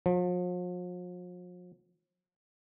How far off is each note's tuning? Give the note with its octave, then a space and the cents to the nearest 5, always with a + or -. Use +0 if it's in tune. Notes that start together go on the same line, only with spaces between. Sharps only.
F3 +40